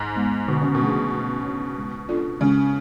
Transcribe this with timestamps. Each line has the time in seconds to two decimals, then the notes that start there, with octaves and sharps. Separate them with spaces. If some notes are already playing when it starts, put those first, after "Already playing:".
Already playing: G#2
0.16 G#3 B3
0.48 B2 D3
0.61 C#3
0.75 B2
0.81 F3 A3 D4 G#4
1.13 A3
1.44 D4 F#4 C#5
1.76 G#3
2.09 D4 F4 A4 D5
2.40 C#3 G#3